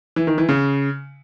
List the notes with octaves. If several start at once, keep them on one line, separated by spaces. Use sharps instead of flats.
E3
D#3
E3
C#3